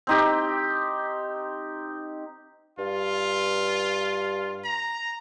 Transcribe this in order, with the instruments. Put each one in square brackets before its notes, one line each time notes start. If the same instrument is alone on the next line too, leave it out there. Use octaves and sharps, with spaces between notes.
[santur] C4 D#4 G4
[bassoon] G2 [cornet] F4
[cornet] A#5